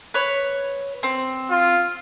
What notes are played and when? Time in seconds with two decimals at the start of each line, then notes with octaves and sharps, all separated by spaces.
0.14 B4 C#5
1.03 C4
1.51 F4